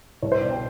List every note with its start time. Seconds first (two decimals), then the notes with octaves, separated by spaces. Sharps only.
0.22 C2 C#5
0.32 C5
0.41 B2 D5
0.50 G5